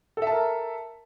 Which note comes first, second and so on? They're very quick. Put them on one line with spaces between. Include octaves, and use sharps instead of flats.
A4 E5 A5 A#4